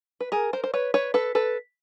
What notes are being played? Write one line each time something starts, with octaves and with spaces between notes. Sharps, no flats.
B4
G#4 A#4
A#4 C5
C5
B4 C#5
B4 C#5
A4 B4
A4 B4